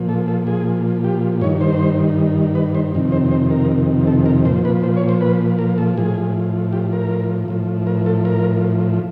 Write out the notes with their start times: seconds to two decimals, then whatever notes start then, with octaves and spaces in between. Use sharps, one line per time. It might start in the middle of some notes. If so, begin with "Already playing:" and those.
Already playing: A#2 F3
0.09 A4
0.28 A4
0.47 G#4
1.04 G4
1.41 G2 D#3 C#5
1.61 C5
2.55 B4
2.75 C5
2.94 F2 C3 D#3
3.12 C5
3.31 C5
3.50 A#4
4.07 A4
4.26 A#4
4.45 A#2 F3 C5
4.65 B4
4.83 C5
4.97 C#5
5.09 C5
5.21 B4
5.59 A#4
5.78 A4
5.97 A2 F3 G#4
6.73 G4
6.92 A#4
7.48 A2 F3
7.87 A#4
8.06 A4
8.25 A#4